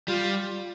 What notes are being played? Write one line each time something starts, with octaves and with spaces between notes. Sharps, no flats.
G3 F4